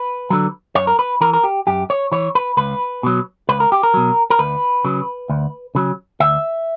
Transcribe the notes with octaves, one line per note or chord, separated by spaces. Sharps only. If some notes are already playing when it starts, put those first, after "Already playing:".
Already playing: B4
D3 F#3
F#2 C#5
A#4
B4
E3 A#4
A#4
G4
F#2 G4
C#5
E3 C#5
B4
C#2 B4
B2 F#3
C#2 B4
A#4
G4
A#4
B2 F#3
A#4
D2 B4
C#3 F#3
D2
C#3 F#3
D2 E5